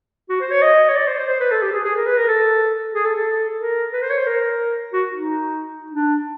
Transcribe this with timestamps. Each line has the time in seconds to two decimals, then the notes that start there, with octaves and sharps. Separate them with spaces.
0.29 F#4
0.41 C5
0.51 C#5
0.62 D#5
0.89 C#5
0.96 D5
1.07 C5
1.18 C5
1.29 C5
1.40 B4
1.51 A4
1.62 G4
1.72 G#4
1.84 G#4
1.96 A#4
2.07 B4
2.18 A#4
2.28 A4
2.94 G#4
3.05 A4
3.16 A4
3.60 A#4
3.93 B4
4.02 C5
4.10 C#5
4.18 C5
4.27 A#4
4.93 F#4
5.14 D#4
5.92 D4